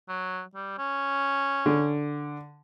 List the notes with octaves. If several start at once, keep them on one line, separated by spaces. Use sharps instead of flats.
F#3
G3
C#4
D3